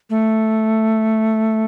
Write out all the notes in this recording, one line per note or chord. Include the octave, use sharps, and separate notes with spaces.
A3